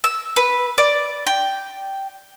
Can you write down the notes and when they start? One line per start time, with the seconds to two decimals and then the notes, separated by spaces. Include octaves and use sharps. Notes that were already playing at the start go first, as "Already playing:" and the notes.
0.04 E6
0.36 B4
0.78 D5
1.27 G5